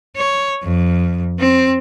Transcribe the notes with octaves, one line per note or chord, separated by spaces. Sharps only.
C#5
F2
C4